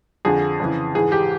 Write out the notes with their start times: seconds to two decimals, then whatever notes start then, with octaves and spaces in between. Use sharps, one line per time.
0.25 F2 D3 F3 G#4
0.60 F2 C#3 E3
0.95 G#2 E3 G#4
1.12 G4